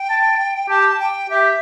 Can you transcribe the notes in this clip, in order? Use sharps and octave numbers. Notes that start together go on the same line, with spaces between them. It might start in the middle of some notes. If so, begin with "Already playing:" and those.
Already playing: G5
A5
G4 A5
A5
G5
G4 E5